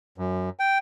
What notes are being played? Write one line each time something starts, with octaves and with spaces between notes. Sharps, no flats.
F#2
G5